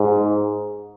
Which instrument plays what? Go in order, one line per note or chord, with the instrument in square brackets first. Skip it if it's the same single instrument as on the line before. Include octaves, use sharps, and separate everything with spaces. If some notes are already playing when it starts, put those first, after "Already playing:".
Already playing: [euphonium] G#2